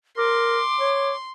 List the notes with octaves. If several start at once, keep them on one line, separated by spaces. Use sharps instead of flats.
A#4 C6 D6
C#5